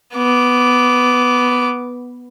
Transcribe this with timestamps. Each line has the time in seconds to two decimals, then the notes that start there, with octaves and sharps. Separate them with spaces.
0.14 B3 D6